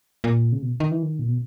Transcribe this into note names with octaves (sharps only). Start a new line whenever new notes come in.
A#2
C#3
B2
D#3
E3
D#3
A#2
B2